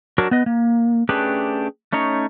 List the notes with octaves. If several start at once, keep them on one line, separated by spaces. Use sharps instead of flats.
F#3 D4 F#4 A#4
B3 B4 D#5
A#3
A3 C#4 D4 G4 G#4 B4
A3 C#4 D#4 C#5